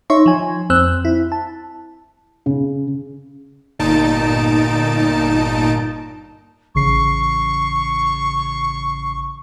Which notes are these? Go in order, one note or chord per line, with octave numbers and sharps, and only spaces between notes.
D#4 C#5 E5 C6 C#6
F3 G#5
F2 C4 C5 E6 F#6
E4
A5
C#3
G1 A#2 D#4 A5 D7
A1 C#3 C#6 C7